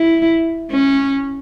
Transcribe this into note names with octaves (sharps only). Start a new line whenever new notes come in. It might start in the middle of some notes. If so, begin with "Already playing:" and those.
Already playing: E4
C#4